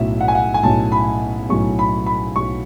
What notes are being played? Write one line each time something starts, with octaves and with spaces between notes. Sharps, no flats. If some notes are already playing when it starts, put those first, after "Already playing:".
Already playing: B1 A2 F#3 C#4 E5
F#5
G#5
F#5
G#5
B1 A2 F#3 C#4 A5
B5
B1 A2 F#3 C#4 C#6
B5
B5
B1 A2 F#3 C#4 C#6